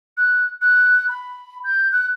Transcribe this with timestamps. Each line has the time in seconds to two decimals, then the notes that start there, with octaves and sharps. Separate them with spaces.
0.17 F#6
0.61 F#6
1.09 B5
1.64 G6
1.92 F#6